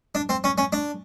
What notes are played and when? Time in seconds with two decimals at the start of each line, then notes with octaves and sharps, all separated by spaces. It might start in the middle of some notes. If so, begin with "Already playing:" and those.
0.15 D4
0.29 C4
0.44 C#4
0.58 C#4
0.73 D4